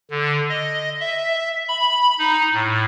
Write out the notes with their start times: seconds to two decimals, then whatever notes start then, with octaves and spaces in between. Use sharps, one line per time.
0.11 D3
0.49 D#5
1.00 E5
1.68 B5
2.19 D#4
2.53 A2